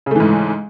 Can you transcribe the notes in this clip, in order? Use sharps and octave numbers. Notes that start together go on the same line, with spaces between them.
G#2 C#3 E3 A3